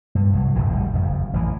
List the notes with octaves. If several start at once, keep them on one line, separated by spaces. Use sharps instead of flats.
G2
C2 A2 F#3
F1 A#1 A2 D3
G#1 D2 A#2 G3
F#1 F2
A1 E3